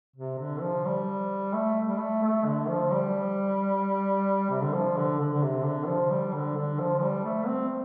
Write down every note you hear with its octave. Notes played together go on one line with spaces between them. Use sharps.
C3
D3
F3
G3
A3
G3
A3
A3
D3
F3
G3
C3
D3
F3
D3
D3
D3
C3
D3
F3
G3
D3
D3
F3
F3
G3
A3
C4